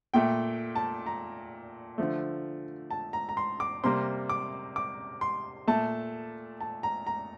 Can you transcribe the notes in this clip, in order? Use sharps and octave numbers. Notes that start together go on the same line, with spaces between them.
A#2 A3 G5
A5
A#5
D3 F3 A3
A5
A#5
A#5
C6
D6
C3 G3 A#3 C6
D6
D6
C6
A#2 A3 A5
A5
A#5
A#5